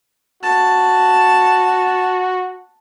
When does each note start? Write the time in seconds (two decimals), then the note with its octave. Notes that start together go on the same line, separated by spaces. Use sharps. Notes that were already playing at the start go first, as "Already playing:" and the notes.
0.43 F#4 A5